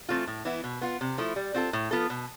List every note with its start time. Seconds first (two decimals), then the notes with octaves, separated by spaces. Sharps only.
0.09 E3 A3 C4 F4
0.27 A2
0.45 E3 B3 E4
0.64 B2
0.81 B3 F4
1.01 C3
1.18 F3 A3 E4
1.36 G3
1.54 C4 F4 A4
1.73 A2
1.91 F3 B3 F4 A4
2.10 B2